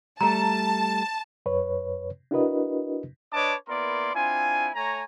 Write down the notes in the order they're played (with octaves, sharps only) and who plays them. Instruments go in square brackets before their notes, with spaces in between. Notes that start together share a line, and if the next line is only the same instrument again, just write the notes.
[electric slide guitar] G3 A3 [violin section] A5 [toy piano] A#5
[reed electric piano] F#2 B4 C#5
D4 E4 F#4 A#4 B4 D#5
[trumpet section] D4 B4 C#5 D#5 A5 D6
A#3 B3 E4 A#4 D5 C6
C4 D4 E4 F4 G#5
A3 C#5 G#5 A#5